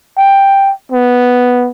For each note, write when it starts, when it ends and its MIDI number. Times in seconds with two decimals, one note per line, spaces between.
0.18 0.72 79
0.92 1.70 59